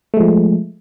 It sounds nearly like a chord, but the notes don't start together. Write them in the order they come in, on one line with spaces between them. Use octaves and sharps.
A3 G#3 F3